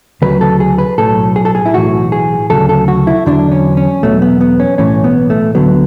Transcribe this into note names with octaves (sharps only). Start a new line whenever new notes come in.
D2 C#3 F#3 B4
A4
G#4
B4
B1 A2 F#3 A4
G#4
A4
G#4
E4
B1 A2 E3 F#4
G#4
D2 C#3 F#3 A4
A4
F#4
E4
E2 D3 F#3 D4
C#4
C#4
E2 B2 F#3 A3
B3
B3
C#4
B1 A2 E3 C#4
B3
A3
D2 D3 F#3 B3